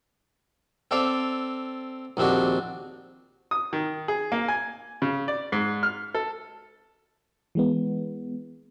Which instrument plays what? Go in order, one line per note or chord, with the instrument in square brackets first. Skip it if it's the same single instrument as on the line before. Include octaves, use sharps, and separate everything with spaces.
[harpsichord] C4 A4 D5 F5
A#1 D#2 C4 D4 F#4
[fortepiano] D#6
D#3
G#4
A#3
G#5
C#3
D5
G#2
F6
A4
[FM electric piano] E3 G#3 B3